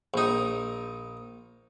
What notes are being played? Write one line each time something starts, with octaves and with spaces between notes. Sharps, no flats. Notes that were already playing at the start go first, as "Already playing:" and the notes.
A#1 D#4